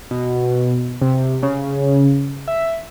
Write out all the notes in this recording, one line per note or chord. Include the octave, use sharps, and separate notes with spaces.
B2
C3
C#3
E5